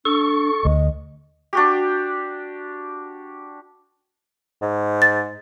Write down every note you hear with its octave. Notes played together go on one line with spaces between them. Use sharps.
D4 A4 C#6
D2 D#5
D4 F#4 G4
G#2
A6